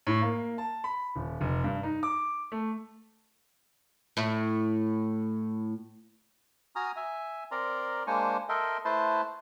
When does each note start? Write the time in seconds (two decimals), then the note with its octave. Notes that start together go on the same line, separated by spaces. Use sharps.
0.07 A2
0.22 A#3
0.58 A5
0.84 B5
1.16 D#1
1.41 F1
1.64 G2
1.83 D#4
2.03 D6
2.52 A3
4.17 A2 E4
6.76 F#4 G#5 A#5 D#6 F6
6.96 E5 G#5
7.51 C4 A#4 D5 A#5 C6
8.07 G#3 A#3 D4 C5 G#5 C#6
8.49 A4 A#4 D#5 E5 G5 C6
8.85 A3 E4 B4 C5 A5 C6